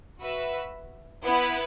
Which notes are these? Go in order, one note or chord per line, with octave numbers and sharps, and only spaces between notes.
F#4 B4 E5
B3 E4 B4